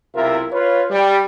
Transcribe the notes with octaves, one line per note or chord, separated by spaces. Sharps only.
B1 C3 E4 F4 A#4 E5
F4 B4 C#5
G3